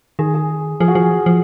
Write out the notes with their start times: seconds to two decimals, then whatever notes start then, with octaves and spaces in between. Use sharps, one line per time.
0.19 D#3 G#4
0.34 G#4
0.80 F3 G#4
0.88 F#4
0.95 F3 G#4
1.26 F3